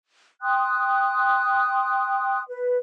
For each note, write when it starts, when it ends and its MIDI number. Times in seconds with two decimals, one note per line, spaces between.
0.42 2.42 79
0.42 2.42 84
0.42 2.42 87
0.42 2.42 90
2.47 2.77 71